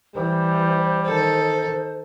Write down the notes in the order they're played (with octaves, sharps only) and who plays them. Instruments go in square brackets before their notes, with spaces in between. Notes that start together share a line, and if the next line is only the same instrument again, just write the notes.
[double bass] E3 [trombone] G3 [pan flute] C5
[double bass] D#3 [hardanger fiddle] A4